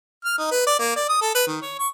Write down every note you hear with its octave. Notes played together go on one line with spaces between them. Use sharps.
F6
D#4
B4
D5
A#3
D5
D#6
A4
B4
D#3
C#5
C#6